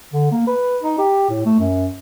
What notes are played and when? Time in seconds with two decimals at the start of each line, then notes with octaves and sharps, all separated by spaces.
0.13 D3
0.31 A#3
0.48 B4
0.83 D#4
0.99 G4
1.30 A2
1.45 A3
1.59 F#2